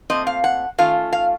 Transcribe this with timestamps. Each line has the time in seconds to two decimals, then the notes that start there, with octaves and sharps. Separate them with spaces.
0.10 A#2 A3 C4 D#5
0.27 F5
0.44 F#5
0.78 D#3 A3 C#4 F4 F5
1.13 F5